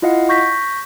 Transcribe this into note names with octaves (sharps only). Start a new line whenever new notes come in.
E4 F4 D#5 F5 F#5
C#6 G6 A#6 B6